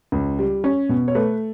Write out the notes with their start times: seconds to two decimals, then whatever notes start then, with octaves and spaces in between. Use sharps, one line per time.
0.12 C#2
0.39 G3
0.64 C#4
0.89 B2
1.08 C#5
1.15 A3 B4